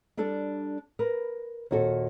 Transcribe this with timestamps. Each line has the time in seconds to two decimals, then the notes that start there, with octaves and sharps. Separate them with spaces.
0.17 G3 D4 A4 D5
0.99 A#4 B4
1.71 D#2 A#2 F#4 A4